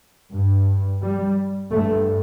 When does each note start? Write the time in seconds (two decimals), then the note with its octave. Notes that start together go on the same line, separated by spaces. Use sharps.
0.33 G2
1.02 G3
1.71 G2 A3